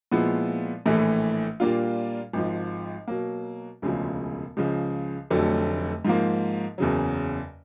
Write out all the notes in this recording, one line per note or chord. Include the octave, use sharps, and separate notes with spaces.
A#2 F3 G#3 B3 E4
A#1 A2 E3 A3
A#2 G3 A#3 D4 F4
G#1 G#2 F3
B2 F#3 A#3
E1 D2 C#3 F3 G#3
C#2 C#3 F3
F1 F2 D3 F#3 A3
G#2 F3 A#3
F#1 E2 C#3 F#3